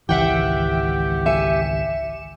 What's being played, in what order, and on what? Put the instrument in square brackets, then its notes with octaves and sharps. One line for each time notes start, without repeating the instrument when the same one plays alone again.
[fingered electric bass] G#1 C#2 E3 [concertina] G4 [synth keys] E5 F#5 G5
[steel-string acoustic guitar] E5 G#5 [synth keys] C#7 E7